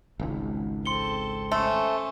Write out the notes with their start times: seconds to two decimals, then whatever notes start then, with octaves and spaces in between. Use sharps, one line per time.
0.20 G#1 C#2
0.86 C4 A4 C6 C#7 G7
1.52 A3 C#4 C5 C6